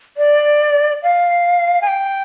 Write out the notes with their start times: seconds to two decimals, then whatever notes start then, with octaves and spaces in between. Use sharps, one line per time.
0.17 D5
1.03 F5
1.82 G#5
1.88 G5